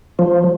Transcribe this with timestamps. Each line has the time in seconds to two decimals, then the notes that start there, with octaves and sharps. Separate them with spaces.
0.19 F3